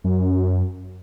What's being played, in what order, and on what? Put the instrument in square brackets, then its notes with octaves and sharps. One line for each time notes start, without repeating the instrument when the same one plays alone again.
[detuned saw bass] F#2